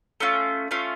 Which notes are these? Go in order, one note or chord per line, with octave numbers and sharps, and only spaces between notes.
A3 C#4 F4
A3 C#4 F4